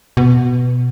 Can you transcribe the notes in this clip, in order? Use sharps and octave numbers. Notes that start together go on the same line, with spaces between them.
B2